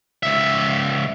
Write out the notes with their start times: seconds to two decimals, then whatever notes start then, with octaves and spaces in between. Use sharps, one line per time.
0.23 C#2 E5